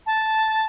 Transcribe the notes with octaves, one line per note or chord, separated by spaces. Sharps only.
A5